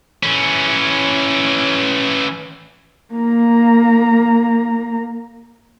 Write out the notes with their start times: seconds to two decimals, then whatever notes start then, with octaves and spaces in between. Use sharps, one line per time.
0.23 E3 C#4
3.13 A#3 A#5